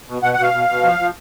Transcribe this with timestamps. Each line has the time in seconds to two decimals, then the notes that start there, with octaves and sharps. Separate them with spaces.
0.08 B2
0.22 B2 F#5
0.33 F#5
0.39 B2 F5
0.53 B2
0.69 B2
0.83 F3
0.99 F3